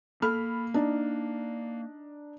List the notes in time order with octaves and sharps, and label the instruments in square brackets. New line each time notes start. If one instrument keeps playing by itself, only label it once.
[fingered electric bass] A#3 [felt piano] A4 B5 F6
[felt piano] D4 D#4